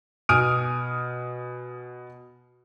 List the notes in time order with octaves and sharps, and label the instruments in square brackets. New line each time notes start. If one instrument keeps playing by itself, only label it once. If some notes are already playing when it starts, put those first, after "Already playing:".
[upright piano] B2 G#5 D#6 F6 D7